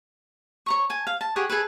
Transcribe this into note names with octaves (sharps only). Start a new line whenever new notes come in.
C#5 A#5 C#6
G#5 A5
F5
A5
G4 G#4 C#5 F#5
G#4 A4 B4